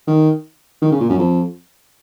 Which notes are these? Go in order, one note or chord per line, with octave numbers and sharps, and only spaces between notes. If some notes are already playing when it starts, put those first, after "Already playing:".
D#3
D#3
C#3
A#2
F#2
F2